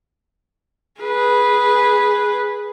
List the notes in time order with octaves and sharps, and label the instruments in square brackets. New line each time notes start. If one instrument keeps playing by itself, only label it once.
[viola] G#4 B4